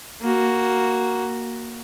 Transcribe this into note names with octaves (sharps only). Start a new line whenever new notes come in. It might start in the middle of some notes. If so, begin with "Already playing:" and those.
A#3 F#4